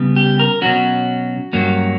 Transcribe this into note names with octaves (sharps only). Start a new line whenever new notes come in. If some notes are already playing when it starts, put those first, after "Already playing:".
Already playing: C#3 G3 B3
G4
A#4
B2 F#3 C#4 F#4
G2 F#3 A#3 C#4